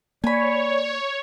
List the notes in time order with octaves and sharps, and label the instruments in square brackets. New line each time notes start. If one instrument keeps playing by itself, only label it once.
[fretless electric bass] A#3 [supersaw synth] C#5 [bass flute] D5 [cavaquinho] G#5 B5